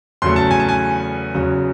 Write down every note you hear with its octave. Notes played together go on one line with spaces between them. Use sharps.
E2 C#3 F#3 A3 C6
A5
G#5
A5
G#5
E2 C#3 F#3